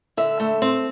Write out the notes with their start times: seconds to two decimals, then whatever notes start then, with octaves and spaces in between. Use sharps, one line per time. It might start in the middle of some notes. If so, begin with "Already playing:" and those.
0.17 D3 E5
0.40 A3
0.62 C4